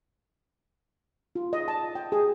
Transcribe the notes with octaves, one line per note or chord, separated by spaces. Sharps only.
F4
D#5
A5
G5
G#4